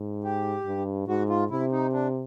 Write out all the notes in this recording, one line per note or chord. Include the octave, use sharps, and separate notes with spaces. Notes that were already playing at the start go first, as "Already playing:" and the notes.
Already playing: G#2
G4
G2
G#2 F#4
F4
C3 E4
D#4
D4